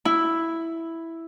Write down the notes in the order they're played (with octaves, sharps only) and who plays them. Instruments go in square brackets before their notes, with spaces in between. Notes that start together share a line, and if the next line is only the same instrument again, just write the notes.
[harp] E4